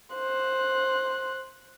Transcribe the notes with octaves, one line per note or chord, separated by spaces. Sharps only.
C5 F#6